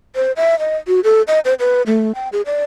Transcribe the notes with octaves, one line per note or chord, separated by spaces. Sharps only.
C5
E5
D#5
F#4
A4
D#5
C5
B4
A3
G5
G#4
D5